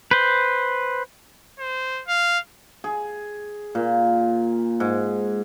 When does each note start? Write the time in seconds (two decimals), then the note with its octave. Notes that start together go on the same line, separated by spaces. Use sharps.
0.11 B4 C5
1.59 C5
2.08 F5
2.84 G#4
3.75 A#2
4.80 G#2